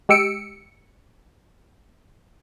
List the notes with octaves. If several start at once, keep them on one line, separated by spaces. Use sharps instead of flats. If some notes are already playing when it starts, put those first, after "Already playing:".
G#3 G4 E6 C#7 D7